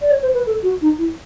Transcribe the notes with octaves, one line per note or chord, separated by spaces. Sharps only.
D5
C#5
C5
B4
A4
F#4
D#4
E4